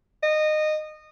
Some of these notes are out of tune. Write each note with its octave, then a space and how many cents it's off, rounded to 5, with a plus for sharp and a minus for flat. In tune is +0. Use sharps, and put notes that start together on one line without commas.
D#5 -20